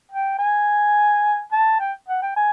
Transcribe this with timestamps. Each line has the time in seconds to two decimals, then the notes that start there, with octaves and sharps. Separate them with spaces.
0.12 G5
0.39 G#5
1.53 A5
1.80 G5
2.09 F#5
2.22 G5
2.36 G#5